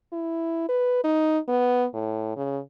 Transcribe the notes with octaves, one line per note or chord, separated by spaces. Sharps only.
E4
B4
D#4
B3
A2
C#3